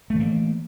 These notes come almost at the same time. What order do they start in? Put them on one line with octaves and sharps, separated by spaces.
A3 E3 A#3